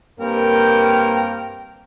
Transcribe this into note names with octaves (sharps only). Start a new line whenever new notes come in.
G2 A#3 C4 A#4 G5